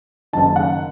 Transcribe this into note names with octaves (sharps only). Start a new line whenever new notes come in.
F#1 F#2 D#3 A5
F#5